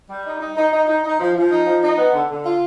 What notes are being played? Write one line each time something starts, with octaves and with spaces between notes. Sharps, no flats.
G3
D#4
D#4
D#4
D#4
D#4
D#4
F3
F3
D#4
F3
D#4
B3
D3
D3
F4